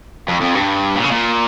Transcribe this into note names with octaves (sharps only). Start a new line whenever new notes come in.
F2
F2
G2
A#2
C#3
A#2